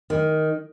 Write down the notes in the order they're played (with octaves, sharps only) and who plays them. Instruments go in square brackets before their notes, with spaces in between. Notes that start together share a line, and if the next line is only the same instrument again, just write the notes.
[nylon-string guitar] D#3